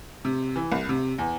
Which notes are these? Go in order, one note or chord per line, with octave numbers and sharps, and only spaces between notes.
C3
E3
C2
C3
E2